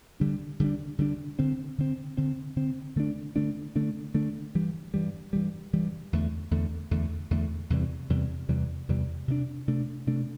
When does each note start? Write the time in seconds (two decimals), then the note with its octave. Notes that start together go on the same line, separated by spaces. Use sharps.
0.20 D3 G3 D4
0.60 D3 G3 D4
0.98 D3 G3 D4
1.39 D3 C4
1.78 D3 C4
2.17 D3 C4
2.56 D3 C4
2.96 D3 A3 D4
3.36 D3 A3 D4
3.75 D3 A3 D4
4.14 D3 A3 D4
4.55 G2 E3 G3
4.94 G2 E3 G3
5.33 G2 E3 G3
5.73 G2 E3 G3
6.13 E2 D3 A3
6.51 E2 D3 A3
6.91 E2 D3 A3
7.31 E2 D3 A3
7.70 E2 C3 E3 G3
8.09 E2 C3 E3 G3
8.48 E2 C3 E3 G3
8.88 E2 C3 E3 G3
9.28 C3 A3 D4
9.68 C3 A3 D4
10.07 C3 A3 D4